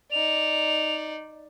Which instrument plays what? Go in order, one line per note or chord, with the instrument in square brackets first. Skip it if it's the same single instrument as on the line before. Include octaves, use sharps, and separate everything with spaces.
[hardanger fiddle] D#4 D5 [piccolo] F7